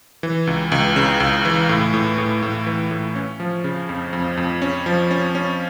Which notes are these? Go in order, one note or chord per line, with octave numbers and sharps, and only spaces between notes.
E3
C#2
C#2
C#3
C#2
E3
A2
A2
A2
A2
E3
A2
C#4
F3
C#3
F2
F2
F2
C#4
F3
C#4
C#4